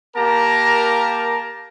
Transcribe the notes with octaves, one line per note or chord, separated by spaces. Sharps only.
A#3 G4 A#4 A5 A#5